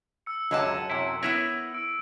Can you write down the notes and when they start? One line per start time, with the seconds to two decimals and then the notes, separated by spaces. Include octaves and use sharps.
0.26 E6 C#7
0.51 C#2 F#2 D3 F#3 D#5 A5
0.90 F#2 C3 E4
1.23 B3 E4 A#4 B4 C#5 E5
1.74 E6 D7